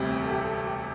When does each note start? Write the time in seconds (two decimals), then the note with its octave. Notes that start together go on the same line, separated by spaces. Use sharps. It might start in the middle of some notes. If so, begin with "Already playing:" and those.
Already playing: E1 D2 C3 G3 C4
0.22 A4
0.31 G4
0.40 A4
0.64 G4